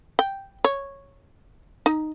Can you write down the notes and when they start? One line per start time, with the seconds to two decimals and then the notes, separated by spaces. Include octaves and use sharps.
0.19 G5
0.64 C#5
1.86 D#4